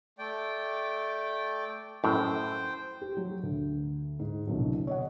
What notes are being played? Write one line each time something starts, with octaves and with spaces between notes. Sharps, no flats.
A3 D5 G5
F#2 A2 C5 G5
G4
F#3
D2
G#2
C2 B2 D3 F#3
C#5 D#5 F#5